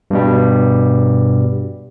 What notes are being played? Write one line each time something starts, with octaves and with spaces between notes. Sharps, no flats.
G2 B2 G3